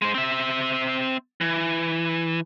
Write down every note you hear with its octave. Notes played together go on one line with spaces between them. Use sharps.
G#3 C5
C4 E5
E3